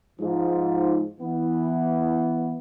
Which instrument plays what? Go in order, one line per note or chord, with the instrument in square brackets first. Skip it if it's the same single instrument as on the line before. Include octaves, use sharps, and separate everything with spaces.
[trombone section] G#2 F3
E3 B3